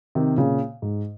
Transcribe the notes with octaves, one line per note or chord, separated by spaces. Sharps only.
C3 D#3
A#2 C#3
G#2